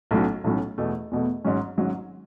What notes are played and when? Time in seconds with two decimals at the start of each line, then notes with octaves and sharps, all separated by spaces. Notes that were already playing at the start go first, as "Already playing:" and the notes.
0.11 B1 A2 F#3 C#4
0.44 B1 A2 F#3 C#4
0.78 E2 B2 A3
1.11 E2 B2 A3
1.44 G#1 G#2 F#3 C#4
1.78 G#1 G#2 F#3 C#4